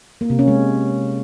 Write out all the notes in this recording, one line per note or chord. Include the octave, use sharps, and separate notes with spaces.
A#3
C3
C#4
G#3